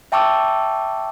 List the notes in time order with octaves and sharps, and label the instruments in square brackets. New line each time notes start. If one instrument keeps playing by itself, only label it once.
[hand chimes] E5 G5 A5 C#6 D6 E6